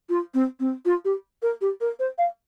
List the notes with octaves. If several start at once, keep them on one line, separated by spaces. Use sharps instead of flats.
F4
C4
C4
F4
G4
A#4
G4
A#4
C5
F5